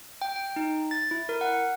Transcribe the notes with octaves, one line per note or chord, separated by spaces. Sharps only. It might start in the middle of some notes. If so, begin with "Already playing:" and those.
G5
G5
D#4
A6
E4
A#4
F#5